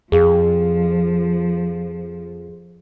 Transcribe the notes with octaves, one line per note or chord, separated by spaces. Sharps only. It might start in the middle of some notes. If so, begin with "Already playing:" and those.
F2 F3 G#4 F5